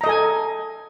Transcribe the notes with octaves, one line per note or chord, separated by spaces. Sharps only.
A4 D#5 G#5 A#5